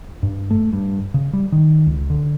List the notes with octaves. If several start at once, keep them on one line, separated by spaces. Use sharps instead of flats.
G2
A3
G2
C#3
G3
D#3
C#2
D3